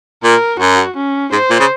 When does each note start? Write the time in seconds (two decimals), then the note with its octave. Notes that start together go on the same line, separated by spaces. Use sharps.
0.24 A#2 A#4
0.60 F#2 F#4
0.96 C#4
1.32 G#2 C5
1.51 A#2
1.60 C#3